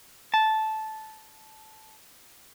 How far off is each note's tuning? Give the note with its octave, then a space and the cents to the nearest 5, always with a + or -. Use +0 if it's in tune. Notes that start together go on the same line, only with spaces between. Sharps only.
A5 -10